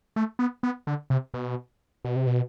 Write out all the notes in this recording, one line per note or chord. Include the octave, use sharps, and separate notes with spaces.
A3
B3
B3
D3
C3
B2
B2
C3
B2